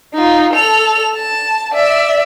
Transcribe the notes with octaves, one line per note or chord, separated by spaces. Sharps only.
D#4 F4
A4 F7
A5
D5 E5